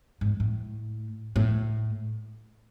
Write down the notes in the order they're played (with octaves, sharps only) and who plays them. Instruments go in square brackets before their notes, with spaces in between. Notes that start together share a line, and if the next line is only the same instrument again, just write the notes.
[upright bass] G#2
A2
A2